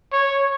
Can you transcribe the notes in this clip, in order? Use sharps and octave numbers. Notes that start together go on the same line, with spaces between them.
C#5